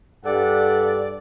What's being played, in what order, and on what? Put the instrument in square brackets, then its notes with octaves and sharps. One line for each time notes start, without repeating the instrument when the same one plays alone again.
[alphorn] G2 [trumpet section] G4 F#5 [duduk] A4 [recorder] D5